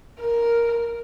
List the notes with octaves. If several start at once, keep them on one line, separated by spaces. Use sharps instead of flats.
A#4